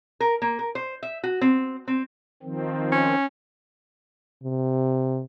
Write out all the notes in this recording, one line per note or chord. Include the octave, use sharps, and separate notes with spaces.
A#4
A#3
A#4
C5
E5
F#4
C4
C4
D#3 F3 C4
C#4
C3